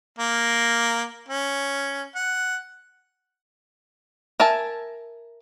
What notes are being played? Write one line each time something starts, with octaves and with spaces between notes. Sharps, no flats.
A#3
C#4
F#5
A#4 E5 G#5 A5